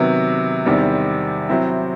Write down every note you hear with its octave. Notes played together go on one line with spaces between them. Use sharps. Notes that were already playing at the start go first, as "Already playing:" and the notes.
Already playing: C3 D#3 F#3 B3
E2 C3 D#3 G3 C4
C3 F#3 C4 E4